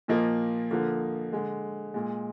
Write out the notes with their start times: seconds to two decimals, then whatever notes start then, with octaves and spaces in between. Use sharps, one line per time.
0.08 A#2 F3 A#3 D#5
0.71 D3 F3 A#3
1.33 D3 G#3
1.94 A#2 G#3